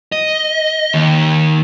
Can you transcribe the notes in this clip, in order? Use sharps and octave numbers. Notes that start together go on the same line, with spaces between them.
D#5
D#2